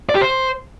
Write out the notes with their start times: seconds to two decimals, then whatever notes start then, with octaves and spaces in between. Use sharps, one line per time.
0.09 D5
0.15 G4
0.21 C5